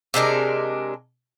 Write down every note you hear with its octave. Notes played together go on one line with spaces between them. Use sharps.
C3 G#3 D4 A#4